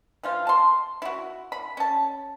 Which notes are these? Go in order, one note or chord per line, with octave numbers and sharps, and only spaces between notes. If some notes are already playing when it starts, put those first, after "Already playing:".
E3 F3 F4
A5 C6
E4 F#4
B5
C#4 A5